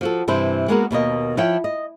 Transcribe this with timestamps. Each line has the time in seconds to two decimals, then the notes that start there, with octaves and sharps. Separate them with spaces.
0.01 F3 F#4 A4
0.28 G2 C3 E3 E4 C5
0.68 G#3 A#3 B3 F#4 G#4 A#4
0.91 D#2 B2 A#3 D#5
1.37 F3 E4 C#5 G5
1.64 D#5